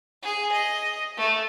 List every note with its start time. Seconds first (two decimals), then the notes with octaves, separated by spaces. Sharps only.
0.22 G#4
0.52 D#5
1.17 A3